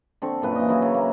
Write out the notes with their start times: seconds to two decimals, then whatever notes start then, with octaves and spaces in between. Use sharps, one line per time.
0.22 D3 C4 C#6
0.42 F#2 A#2 B4
0.55 E3 D#5
0.68 C#3 F#3 E4 F#4
0.82 C#3 C#5
0.94 A#3